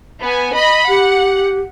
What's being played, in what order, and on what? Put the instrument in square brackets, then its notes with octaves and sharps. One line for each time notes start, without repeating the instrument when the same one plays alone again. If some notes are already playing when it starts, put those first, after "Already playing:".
[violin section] B3 G#5
D#5 B5
[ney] G4 [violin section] F#5